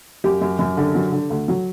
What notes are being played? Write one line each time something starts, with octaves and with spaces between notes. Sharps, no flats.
F#2 G4
F#2
F#2
D3
F#3
D3
D2
F#3